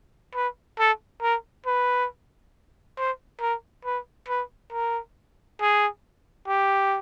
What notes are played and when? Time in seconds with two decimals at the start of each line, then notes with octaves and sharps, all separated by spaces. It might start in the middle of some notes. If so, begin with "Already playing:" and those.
0.34 B4
0.79 A4
1.22 A#4
1.66 B4
2.98 C5
3.41 A#4
3.85 B4
4.28 B4
4.72 A#4
5.61 G#4
6.47 G4